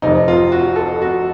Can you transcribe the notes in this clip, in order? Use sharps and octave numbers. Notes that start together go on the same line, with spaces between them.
F1 F2 C3 D#4
F4
F#4
A4
F#4